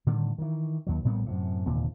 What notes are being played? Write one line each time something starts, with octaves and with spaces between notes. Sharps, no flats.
A2 D3 D#3 G3
D#3 E3
D#2 F#3
A#1 A2 G3 B3
F#2 A2 C3
F1 D#2 A#2 D3